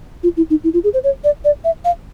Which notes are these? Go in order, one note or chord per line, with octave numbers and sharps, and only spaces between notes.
F4
E4
D#4
E4
F4
G#4
C5
C#5
D5
D5
E5
F5